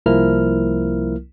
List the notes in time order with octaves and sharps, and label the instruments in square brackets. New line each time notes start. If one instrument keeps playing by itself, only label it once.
[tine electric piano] C2 F3 A#3 E4 A#4 F6